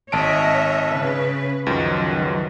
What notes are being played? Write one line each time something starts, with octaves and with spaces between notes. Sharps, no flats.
G#1 C#5 D#5 E5 A5 D7
C#3 B4
C#2 F#2 D#3 F3 F#3